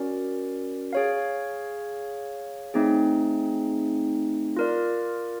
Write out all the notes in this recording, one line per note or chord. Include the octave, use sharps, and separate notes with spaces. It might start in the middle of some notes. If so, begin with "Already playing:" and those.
Already playing: C#4 F#4 A#4 D5
G#4 C#5 F5
A3 C4 D#4 G#4
F4 A#4 D5